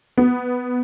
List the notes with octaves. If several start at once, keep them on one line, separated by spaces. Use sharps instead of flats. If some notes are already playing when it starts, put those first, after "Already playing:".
B3